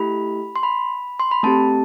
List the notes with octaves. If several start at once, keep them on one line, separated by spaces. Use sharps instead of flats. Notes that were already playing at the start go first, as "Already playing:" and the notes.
Already playing: A3 E4 G4 B5
C6
B5
C6
B5
A3 C4 G4 A5